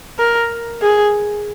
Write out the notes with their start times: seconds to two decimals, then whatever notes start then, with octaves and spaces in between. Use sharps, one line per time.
0.19 A#4
0.82 G#4